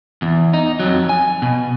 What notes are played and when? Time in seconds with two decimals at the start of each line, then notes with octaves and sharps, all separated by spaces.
0.22 E2
0.53 D#4
0.80 F2 F#3
1.09 G#5
1.42 B2